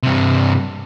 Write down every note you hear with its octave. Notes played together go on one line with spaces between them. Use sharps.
G2 C3